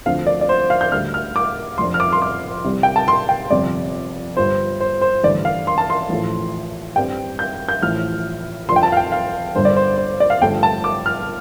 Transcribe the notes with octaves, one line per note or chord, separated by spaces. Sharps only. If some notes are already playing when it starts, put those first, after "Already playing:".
D2 D3 F3 C4 F5
D5
D5
C5
F5
G6
D2 D3 G3 F6
F6
D6
F1 F2 F3 D4 C6
F6
D6
C6
D6
C2 C3 G3
G5
A5
C6
G5
G1 F2 C3 F3 D5
G1 G2 F3 C5
C5
C5
A1 G2 D3 D5
F5
C6
A5
C6
A1 A2 F3 A3
G2 G3 C4 G5
G6
G6
A1 A2 F3 F6
F1 F2 F3 D4 C6
G5
A5
F5
G5
F5
G1 G2 D3 G3 C5
D5
C5
C5
D5
F5
G1 G2 F3 A3 D4 G5
A5
D6
F6